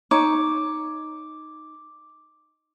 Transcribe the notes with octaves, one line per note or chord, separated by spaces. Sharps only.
D#4 C#5 A#5 D6